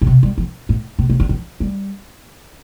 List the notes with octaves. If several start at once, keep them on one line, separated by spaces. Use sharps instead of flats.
A2
C3
G3
F3
A2
C3
C3
D3
F3
G3